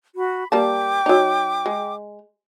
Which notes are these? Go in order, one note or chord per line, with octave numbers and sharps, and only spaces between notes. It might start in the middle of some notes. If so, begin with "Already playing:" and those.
F#4 B5
G3 A#3 G5 A5 D6
F#3 D#4
G#3